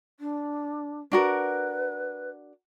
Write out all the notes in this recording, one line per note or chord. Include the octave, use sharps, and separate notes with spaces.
D4
D4 F#4 A#4 B4